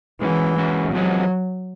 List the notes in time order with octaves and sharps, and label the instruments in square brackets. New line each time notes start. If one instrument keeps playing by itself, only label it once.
[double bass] E3 [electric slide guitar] G#3 C#4 F#4
[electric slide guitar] G#3 C#4 F#4
[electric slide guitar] E2 C3 F3 G#3 B3 [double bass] F#3